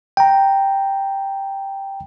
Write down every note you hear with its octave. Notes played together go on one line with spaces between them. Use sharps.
G5 A#5